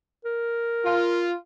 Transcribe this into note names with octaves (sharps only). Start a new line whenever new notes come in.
A#4
F4